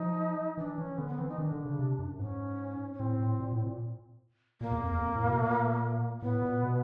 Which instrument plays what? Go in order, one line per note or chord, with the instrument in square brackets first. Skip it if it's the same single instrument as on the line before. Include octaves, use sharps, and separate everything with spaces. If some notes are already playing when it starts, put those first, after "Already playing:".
Already playing: [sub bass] F3 [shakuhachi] D#4
[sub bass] E3 [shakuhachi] D4
[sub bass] E3 [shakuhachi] C#4
[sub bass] D3 [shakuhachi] B3
[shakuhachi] B3
[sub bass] E3 [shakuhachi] C4
[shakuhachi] D#4
[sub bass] D#3 [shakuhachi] D4
[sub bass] D3
C#3
C3
F#2
[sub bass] G#2 [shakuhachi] C#4
[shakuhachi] C#4
[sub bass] A2 [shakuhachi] C4
[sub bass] A2
A#2
A2
A#2
[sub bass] A#2 [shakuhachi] A#3
[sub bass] E2
F2
E2
F2
A2
B2
A#2
[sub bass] A2 [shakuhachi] B3
[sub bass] A#2
B2